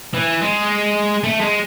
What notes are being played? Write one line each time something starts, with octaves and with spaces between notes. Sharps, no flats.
E3
G#3
A3
G#3